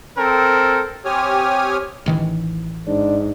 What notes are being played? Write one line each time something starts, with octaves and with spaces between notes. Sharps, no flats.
C4 A4 A#4
C4 G4 C#5 G#5 D#6 F6
A1 D#3 E3
G#2 D4